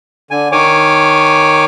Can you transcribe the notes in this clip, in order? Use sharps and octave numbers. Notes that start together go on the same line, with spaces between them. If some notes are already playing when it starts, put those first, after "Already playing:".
D3 G#5
D#3 C#5 G#5 D6